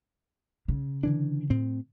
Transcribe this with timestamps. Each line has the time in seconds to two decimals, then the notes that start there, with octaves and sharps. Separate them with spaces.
0.68 C#3
1.03 D3 E3 D4
1.50 A2 C4